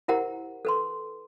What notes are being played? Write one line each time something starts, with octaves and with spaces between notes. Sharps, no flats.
E4 G4 A#4 C5 F#5 A#5
A4 B4 C6